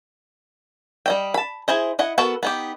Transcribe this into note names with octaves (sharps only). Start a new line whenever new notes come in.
G3 D#5 G5
A5 B5
E4 G#4 C5 D#5
E4 D#5 F#5
B3 F#4 A4 A#4
B3 D#4 G4